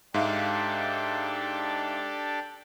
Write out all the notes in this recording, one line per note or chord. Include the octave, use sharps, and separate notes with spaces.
G#2 D4 G4 A4 E5 F5